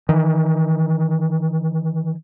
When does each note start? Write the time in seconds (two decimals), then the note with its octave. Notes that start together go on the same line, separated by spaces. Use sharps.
0.09 D#3 E3